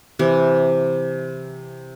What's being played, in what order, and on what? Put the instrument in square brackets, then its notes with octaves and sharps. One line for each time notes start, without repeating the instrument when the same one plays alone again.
[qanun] C3 E3